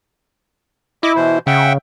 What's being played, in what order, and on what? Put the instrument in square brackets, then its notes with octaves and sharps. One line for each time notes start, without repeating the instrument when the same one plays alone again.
[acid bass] E4 [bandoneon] D#5 D6
[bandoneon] B2 E3 C5
[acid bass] C#3 [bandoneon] E5 F#5 G5